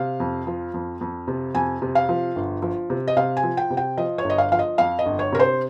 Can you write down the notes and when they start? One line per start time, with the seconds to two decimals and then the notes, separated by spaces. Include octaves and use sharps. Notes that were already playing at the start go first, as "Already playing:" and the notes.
Already playing: C3 F5
0.20 F2
0.47 F3
0.74 F2
1.01 F2
1.28 C3
1.55 F2 G#5
1.82 C3
1.95 F5
2.09 F3
2.36 G1
2.62 F3
2.90 C3
3.08 D#5
3.17 C3 F5
3.37 G#5
3.44 F3
3.57 G5
3.70 C3
3.77 G5
3.98 F3 D#5
4.18 C#5
4.24 G1
4.30 D#5
4.38 F5
4.52 F3 F5
4.59 D#5
4.78 F2 F5
4.99 D#5
5.06 G1
5.19 C#5
5.32 C3 A#4
5.39 C5